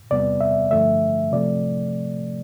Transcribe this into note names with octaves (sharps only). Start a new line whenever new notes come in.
E2 C3 G3 B3 D5
E5
G2 D3 F3 A3 E5
C3 F3 A3 D5